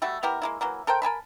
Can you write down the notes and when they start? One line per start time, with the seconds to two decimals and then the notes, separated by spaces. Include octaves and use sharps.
0.02 G3 A3 F#4 E5
0.23 B3 E4 G4 A#4
0.42 G#3 A#3 E4
0.61 E3 F#3 A#3
0.87 A4 A#4 C5 G5
1.02 A#4 G#5 A5 B5